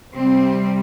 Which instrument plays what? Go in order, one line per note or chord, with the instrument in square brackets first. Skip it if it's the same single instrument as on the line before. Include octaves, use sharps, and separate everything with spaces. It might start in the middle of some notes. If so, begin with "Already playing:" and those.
[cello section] C3 G3 C4